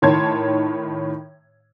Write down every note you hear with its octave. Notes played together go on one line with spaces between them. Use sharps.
A2 D#3 C#5 A5 C6 G#6